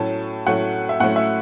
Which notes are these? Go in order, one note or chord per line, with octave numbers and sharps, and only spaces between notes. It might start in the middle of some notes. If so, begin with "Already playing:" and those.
Already playing: A2 F#3 A3 C#4 A5
A2 F#3 A3 C#4 F#5
E5
A2 F#3 A3 C#4 F#5
E5